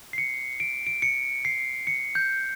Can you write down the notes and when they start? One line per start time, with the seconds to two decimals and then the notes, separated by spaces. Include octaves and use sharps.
0.13 C7
0.18 C#7
0.60 D7
0.87 D7
1.02 C#7
1.45 C7
1.87 C#7
2.15 G6